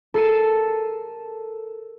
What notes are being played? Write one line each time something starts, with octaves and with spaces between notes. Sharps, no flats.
A4 A#4 C7 C#7 D#7 E7